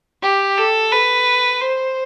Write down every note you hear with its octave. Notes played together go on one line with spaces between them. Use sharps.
G4
A4
B4
C5